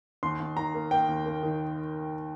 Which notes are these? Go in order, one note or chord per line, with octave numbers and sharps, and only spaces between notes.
D#2 C6
D#2
D#3 A#5
A#3
A#3 G5
D#2
A#3
D#3